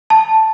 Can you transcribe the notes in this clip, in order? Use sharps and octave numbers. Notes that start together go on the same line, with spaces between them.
A5